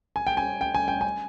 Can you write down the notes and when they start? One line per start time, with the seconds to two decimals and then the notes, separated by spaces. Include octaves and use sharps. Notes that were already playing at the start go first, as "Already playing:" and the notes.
0.16 G#5
0.27 G5
0.37 G#5
0.61 G5
0.75 G#5
0.88 G5
1.01 G#5